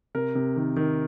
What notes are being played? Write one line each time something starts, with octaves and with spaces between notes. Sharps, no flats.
C3 A#4
C3
D#3
D#3